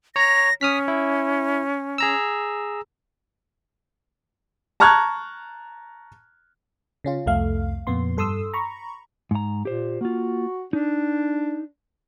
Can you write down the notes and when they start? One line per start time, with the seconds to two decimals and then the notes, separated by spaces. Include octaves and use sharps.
0.16 C#5 A#5 A#6
0.61 C#4 D#6 F6 B6
0.88 E4
1.98 G#4 A#5 E6
4.80 A5 A#5 C#6 F6 F#6 G#6
7.04 C#3 C#4 F4
7.26 C2 F2 A3 F5
7.87 F2 A#2 B3 C6
8.17 G2 A4 C6 D#6 E6
8.54 A#5 B5 C#6
9.31 G#2 A#5
9.65 A#2 G4 C5
10.01 A#3 F4 F#4
10.73 D4 D#4